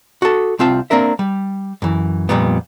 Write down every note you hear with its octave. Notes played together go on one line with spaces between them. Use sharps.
F#4 A4
C2 C4 F4 A5
A#3 C4 D4 A#4 E5
G3
F#2 E3
F2 A#2 G3 B3